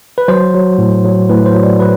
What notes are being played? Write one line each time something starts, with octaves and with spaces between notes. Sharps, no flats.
B4
F#3 C5
F#3
A2
F#3
A2 B4
C5
F#3
D5
F#3 B4